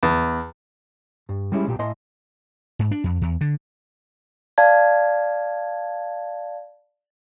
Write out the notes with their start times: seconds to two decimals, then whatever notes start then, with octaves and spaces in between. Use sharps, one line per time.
0.03 E2
1.29 G2
1.52 G3 G#3 C#4 E4 G#4
1.67 B1 A#2 G4 G5
1.79 A2 A3 D#5 G#5 C6
2.79 G#2
2.91 D4
3.04 F2
3.22 E2
3.41 D3
4.58 D5 F5 A5 G#6